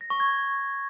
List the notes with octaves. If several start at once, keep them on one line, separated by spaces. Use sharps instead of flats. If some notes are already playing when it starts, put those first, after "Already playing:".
A#6
C#6
G#6